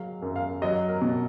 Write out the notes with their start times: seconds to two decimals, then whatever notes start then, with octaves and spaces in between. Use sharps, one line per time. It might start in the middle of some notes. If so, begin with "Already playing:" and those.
Already playing: F#3 G#3 F5
0.22 F#2
0.36 F5
0.62 F#3 D#5
0.88 A#4
1.02 B2